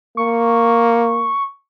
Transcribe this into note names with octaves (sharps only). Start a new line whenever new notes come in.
A#3 C#6